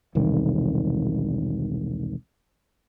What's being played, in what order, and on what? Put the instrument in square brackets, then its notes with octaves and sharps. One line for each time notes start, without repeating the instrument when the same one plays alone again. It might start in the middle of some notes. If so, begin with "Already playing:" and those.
[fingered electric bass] E1 C2 D#3